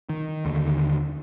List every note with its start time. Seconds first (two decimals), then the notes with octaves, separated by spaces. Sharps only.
0.09 D#3
0.45 D#2 D3